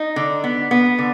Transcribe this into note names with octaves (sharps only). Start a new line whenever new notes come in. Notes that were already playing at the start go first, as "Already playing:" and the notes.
Already playing: D#4
D3
B3
B3
D3